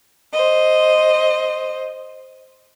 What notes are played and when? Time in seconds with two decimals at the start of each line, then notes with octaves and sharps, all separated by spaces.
0.34 C5 D#5